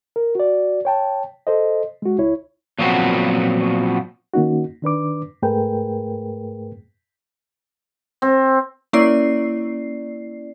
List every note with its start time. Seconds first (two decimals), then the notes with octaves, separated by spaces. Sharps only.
0.16 A#4
0.35 F#4 D5
0.85 C#5 G5 A5
1.47 A4 C5 D#5
2.02 G#3 F#4
2.18 C#2 E4 C#5
2.79 A#2 F3 F#3 B3 C4 F#4
4.34 D#3 A#3 C#4 D#4 F#4
4.82 D#3 D4 B4 D6
5.42 G#2 A3 G#4 A#4 B4 G5
8.22 C4
8.93 A#3 C#4 E4 D5 C7